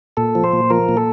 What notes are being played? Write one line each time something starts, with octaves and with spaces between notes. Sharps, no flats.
A#2 A4
F3
C5
A#2
F3 A#4
A#2
A4